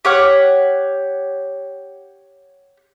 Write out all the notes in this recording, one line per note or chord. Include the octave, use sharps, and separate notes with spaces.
G4 C#5 F#5 F6